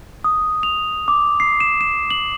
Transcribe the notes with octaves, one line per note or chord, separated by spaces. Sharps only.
D#6
F7
D6
C7
E7
E7
F#7